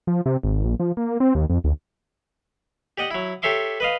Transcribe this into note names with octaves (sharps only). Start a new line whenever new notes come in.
F3
C3
G#1
A#1
F3
A#3
C4
D#2
F2
D2
G4 D5 D#5 F#5
F#3 E4
G4 A4 C#5 E5 C6 D6
B4 D#5 F5